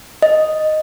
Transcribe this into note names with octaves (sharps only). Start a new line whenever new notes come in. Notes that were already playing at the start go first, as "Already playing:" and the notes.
D#5